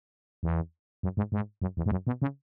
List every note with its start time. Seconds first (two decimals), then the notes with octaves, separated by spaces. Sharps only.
0.43 E2
1.03 F#2
1.17 G#2
1.32 G#2
1.62 F#2
1.77 E2
1.86 G#2
1.91 F#2
2.07 B2
2.22 C#3